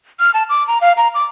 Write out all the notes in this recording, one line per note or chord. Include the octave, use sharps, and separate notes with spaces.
F6
A5
D6
A#5
F5
A#5
D6